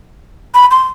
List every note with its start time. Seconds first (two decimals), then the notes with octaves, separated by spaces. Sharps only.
0.54 B5
0.71 C6